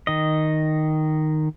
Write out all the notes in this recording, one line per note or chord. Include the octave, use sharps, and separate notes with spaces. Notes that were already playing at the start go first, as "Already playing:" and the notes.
D#3 D#5